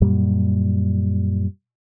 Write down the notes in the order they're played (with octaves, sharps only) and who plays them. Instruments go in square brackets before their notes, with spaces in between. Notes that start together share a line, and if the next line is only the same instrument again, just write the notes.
[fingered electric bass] F#2 A#2 G3